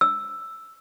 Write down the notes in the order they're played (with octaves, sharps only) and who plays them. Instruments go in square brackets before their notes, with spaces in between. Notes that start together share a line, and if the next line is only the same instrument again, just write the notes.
[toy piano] E6